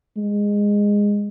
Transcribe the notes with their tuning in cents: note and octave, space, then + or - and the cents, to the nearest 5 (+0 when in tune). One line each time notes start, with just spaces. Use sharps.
G#3 -15